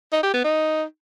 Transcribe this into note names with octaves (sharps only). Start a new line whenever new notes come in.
D#4
G4
B3
D#4